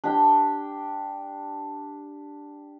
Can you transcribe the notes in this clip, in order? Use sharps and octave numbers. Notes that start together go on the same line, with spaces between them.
D4 G4 G5